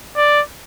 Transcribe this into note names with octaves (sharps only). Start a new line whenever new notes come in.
D5